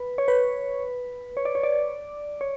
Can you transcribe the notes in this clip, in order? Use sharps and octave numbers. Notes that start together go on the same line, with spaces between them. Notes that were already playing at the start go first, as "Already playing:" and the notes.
Already playing: B4
C#5
B4
C#5
D5
C#5
D5
C#5